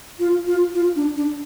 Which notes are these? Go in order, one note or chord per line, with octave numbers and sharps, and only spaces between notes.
F4
F4
F4
D4
D4